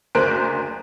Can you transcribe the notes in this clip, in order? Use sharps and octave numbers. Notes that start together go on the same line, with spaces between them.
F#1 D2 A#4 C5 F#6 D7